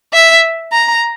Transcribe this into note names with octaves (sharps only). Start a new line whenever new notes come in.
E5
A#5